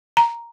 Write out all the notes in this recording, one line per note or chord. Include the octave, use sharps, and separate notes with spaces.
A#5